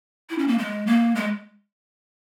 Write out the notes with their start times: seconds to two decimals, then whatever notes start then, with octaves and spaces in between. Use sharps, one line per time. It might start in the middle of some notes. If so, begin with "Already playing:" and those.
0.30 E4
0.39 C#4
0.48 A#3
0.58 G#3
0.87 A#3
1.15 G#3